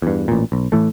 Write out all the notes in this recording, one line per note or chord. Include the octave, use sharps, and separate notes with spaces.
E2 G2
A1 A#2
B1
A2 E3 A3